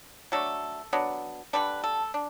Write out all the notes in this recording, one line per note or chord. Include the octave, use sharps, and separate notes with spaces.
F#3 A3 D4 A4
F#3 B3 D4
D3 G3 D4 B4
A4
D4